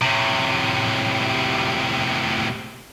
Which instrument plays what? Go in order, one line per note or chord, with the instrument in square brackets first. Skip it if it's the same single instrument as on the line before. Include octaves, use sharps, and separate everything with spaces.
[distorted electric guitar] A2 C3